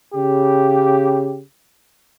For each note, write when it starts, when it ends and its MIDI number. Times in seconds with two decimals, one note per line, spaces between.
0.15 1.40 49
0.15 1.40 67